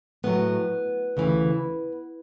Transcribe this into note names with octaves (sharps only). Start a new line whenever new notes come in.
A2 F#3 B3
D2 C#3 E3